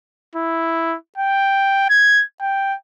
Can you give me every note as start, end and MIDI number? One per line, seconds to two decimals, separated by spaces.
0.36 0.96 64
1.18 1.87 79
1.90 2.24 92
2.41 2.75 79